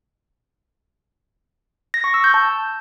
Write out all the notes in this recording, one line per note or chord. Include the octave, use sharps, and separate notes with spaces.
A#6
C#6
E6
G6
A5